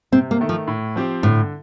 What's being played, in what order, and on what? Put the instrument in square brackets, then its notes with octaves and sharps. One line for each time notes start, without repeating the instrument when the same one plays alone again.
[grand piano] C3 [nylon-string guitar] C4
[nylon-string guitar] A#3
[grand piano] D#3 A3
[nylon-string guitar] F3
[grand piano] A2
F3 C4 G4
[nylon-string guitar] A2 [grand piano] D3